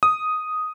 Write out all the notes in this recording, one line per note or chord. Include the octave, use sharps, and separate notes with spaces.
D#6